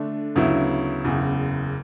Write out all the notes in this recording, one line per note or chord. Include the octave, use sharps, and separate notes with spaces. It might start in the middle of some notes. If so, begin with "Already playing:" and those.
Already playing: D3 A3 D4
D2 C#3 F#3 B3 E4
F#1 E2 C#3